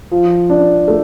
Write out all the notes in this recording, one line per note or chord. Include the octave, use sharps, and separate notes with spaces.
F3
D4
A3